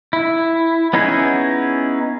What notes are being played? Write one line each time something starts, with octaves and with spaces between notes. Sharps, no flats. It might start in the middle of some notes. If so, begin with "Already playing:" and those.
E4
B3 C#4 D#4 E4 G#4